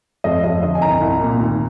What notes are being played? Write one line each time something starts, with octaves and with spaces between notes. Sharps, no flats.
F2 D#5
F2 D#5
D3 D#5
G#5
C2 A#5
C2
A#2
D#2